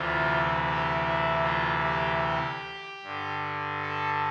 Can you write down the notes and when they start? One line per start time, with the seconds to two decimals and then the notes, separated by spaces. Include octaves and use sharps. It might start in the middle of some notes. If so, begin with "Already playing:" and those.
Already playing: D2 C3 E3 F4
0.66 G4
1.05 E4
1.44 F4
1.83 G4
2.24 G4
3.03 G2 D3
3.82 A4